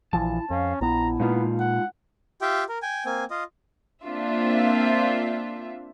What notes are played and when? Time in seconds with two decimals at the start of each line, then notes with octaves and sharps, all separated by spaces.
0.13 A#1 E3 F3 E4 A5
0.50 F2 C#4 F5
0.81 A#1 B3 E4 A#5
1.20 A#2 G#3 A#3 B3 D#4 F4
1.60 F#5
2.41 F4 G4 E5 G5
2.69 A#4
2.82 G5 G#5
3.05 A#3 C4 G#5
3.31 F4 D#5
4.05 A#3 C4 D4 F4 E5